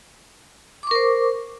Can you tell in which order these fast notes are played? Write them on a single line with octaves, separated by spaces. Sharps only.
D6 C#6 A#4 C5